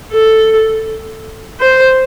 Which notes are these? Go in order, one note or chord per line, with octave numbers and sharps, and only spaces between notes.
A4
C5